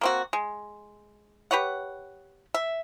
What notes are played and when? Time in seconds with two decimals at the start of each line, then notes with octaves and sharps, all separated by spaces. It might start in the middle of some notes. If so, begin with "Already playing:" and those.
0.01 A#3 C4 F#4
0.33 G#3
1.51 G4 B4 C#5 F#5
2.54 E5